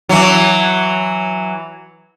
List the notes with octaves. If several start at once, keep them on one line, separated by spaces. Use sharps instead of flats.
E3 F#3